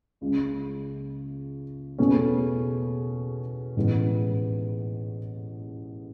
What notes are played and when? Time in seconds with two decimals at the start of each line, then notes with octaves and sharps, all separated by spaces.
0.21 C#2 C#3 G#3
1.98 E2 B2 A3 C#4 G#4
3.76 A1 G#2 E3 G#3 B3